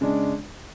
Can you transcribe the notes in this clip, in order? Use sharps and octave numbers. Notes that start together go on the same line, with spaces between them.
C#3 G#3 D4